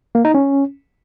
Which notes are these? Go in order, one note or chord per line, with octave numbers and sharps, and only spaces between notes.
A#3
D#4
C#4